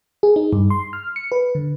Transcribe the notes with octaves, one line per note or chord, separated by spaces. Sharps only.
G#4
D#4
G2
C6
F6
C#7
B4
D3